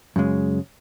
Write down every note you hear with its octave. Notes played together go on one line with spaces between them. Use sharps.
F#2 C#3 G#3